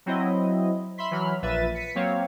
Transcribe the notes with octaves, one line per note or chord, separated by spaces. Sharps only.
F#3 C4 E4 D#5
E5 B5 C6 B6
E3 F#3 B5 F6
A#1 A#2 B4 E5 A6 D#7
B6 C#7 D#7
F#3 A#3 C4 C#5 F5